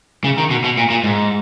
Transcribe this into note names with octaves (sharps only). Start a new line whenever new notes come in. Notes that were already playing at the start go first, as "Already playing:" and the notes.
C#3
D#3
B2
B2
A#2
A#2
G#2